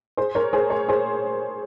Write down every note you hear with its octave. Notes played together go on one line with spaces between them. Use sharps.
G#4 C5
A#4 C#5
G#4 C5
A#4 C#5
G#4 C5